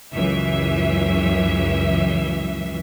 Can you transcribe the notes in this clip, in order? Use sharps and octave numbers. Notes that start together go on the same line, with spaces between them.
C#2 F#2 E3 E5